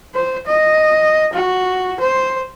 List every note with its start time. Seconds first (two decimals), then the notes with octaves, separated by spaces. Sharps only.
0.15 C5
0.47 D#5
1.33 F#4
2.00 C5